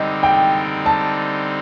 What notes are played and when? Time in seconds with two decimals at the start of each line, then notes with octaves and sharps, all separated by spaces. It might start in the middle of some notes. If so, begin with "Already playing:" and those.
Already playing: D3 G3 C4 D#4 D#5
0.23 G5
0.86 A5